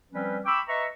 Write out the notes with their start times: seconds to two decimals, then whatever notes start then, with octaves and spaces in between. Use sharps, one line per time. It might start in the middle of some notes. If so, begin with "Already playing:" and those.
0.12 F3 G3 C4 C#4 B4
0.45 G5 B5 C#6 D6 E6
0.68 B4 D#5 E5 A#5 C#6